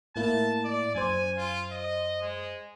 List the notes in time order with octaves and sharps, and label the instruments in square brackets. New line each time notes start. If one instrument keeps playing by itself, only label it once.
[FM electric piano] A2 A#3 E4 [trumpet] A5
[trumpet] D5
[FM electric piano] F#2 C5 [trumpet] G#5
[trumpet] F4
D#5
G#3